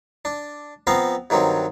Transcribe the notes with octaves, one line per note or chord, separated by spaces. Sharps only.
D4
F3 B3 C4 F5 A#5
G2 D#3 F#3 C4